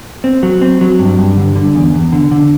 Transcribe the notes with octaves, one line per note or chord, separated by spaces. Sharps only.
C4
F#3
C4
F#3
G2
G2
D3
D3
E2
E2
D3
D3